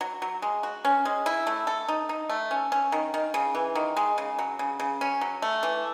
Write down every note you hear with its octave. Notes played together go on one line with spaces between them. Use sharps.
F#3
F#3
G#3
F#4
C#4
G#3
E4
A3
A4
D#4
D#4
A3
C#4
C#4
D#3
D#3
C#3
E3
D#3
G#3
C#3
F#3
C#3
C#3
C#4
F#3
A3
E3